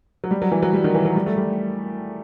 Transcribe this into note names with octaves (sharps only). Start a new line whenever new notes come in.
F#3
G3
F#3
E3
F#3
G3
D#3
E3
F#3
G3
A3
G3